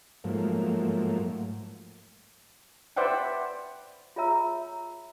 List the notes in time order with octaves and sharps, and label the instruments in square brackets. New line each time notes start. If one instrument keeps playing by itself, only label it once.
[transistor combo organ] G#2 F3 F#3 A3 A#3
[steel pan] B4 C5 D5 E5 F#5 G5
[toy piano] F4 G#4 C#5 E5 A#5 E6